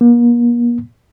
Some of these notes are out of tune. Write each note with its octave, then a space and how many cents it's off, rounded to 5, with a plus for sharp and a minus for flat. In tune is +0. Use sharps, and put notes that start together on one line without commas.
A#3 +40